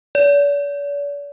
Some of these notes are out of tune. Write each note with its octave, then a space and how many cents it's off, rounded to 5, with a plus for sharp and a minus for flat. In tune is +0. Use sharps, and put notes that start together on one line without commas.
D5 -45